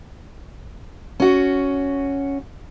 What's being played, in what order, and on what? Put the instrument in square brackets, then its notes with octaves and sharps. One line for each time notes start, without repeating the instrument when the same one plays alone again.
[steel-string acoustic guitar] C#4 F#4